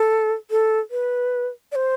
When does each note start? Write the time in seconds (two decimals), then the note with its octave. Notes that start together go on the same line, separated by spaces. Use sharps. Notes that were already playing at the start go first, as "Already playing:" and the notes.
Already playing: A4
0.51 A4
0.91 B4
1.72 D5
1.76 C5